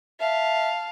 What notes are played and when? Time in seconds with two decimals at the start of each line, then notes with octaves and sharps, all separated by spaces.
0.20 E5 F5 A5